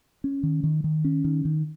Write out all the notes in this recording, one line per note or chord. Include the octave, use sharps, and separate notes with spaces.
C#4
D#3
D#3
D#3
C#4
D#3
D#3